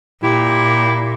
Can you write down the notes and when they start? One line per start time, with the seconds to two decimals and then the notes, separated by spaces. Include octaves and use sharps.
0.23 A#2 E4 G4